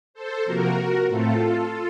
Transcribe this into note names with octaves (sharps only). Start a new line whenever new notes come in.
A4 C5
C3 F3 A#3 F#4 A#4
A2 A3 C4 F4 A4